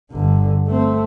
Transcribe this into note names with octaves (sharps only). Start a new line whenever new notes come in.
G1 D3
A3 C4